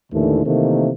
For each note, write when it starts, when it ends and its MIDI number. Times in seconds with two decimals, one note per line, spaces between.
0.12 0.44 39
0.12 0.44 45
0.12 0.44 50
0.12 0.44 52
0.12 0.44 57
0.46 0.91 48
0.46 0.91 51
0.46 0.91 52
0.46 0.91 57
0.46 0.91 58